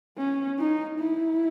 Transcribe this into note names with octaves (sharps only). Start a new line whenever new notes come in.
C#4
D#4
E4